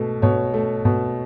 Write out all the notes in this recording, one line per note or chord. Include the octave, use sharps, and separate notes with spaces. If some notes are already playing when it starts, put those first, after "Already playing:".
Already playing: B2 A3
B2 C#5
A3
B2